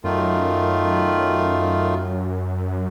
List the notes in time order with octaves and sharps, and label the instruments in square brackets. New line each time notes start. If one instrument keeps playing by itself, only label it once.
[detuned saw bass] F#2 [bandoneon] D#3 A3 F4